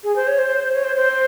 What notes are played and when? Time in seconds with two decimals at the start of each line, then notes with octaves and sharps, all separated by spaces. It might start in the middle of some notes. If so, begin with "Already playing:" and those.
0.04 G#4
0.16 C5
0.27 C#5
0.38 C5
0.73 C#5
0.84 C5
0.96 C5